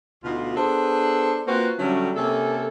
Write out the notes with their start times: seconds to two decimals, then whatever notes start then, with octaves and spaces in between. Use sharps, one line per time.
0.24 D2 B2 D#4 F4
0.56 B3 D4 G#4 A4 C5
1.47 A#3 C4 F4 F#4 B4 C5
1.79 D3 F#3 G3 A3 C#4
2.16 C3 A#3 C#4 A4